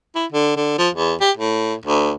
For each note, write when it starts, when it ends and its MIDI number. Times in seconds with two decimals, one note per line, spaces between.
0.15 0.26 64
0.32 0.55 50
0.56 0.77 50
0.78 0.89 53
0.95 1.14 40
1.20 1.31 67
1.37 1.74 45
1.85 2.12 38